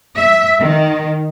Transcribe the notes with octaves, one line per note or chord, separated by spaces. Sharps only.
E5
D#3